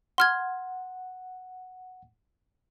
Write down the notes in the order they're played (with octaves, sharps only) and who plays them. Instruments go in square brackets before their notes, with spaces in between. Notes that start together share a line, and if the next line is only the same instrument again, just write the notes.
[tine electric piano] F#5 [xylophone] C6 F6 G#6